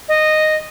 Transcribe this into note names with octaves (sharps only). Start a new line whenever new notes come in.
D#5